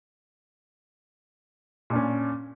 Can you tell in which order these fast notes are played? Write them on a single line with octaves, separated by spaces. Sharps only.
A#2 D4 C#4